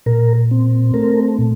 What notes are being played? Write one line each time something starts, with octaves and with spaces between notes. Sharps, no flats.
A#2 A#4
C4
A3 A#4
A#2